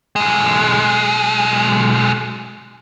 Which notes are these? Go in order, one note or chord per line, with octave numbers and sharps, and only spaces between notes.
B1 G#3